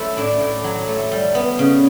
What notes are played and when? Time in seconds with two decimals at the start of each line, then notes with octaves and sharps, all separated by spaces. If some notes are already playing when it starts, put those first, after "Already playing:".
Already playing: F#3 A3 E4
0.17 A2 D4
0.41 A2
0.64 F#3
0.88 A3
1.12 G3
1.35 B3
1.59 C#3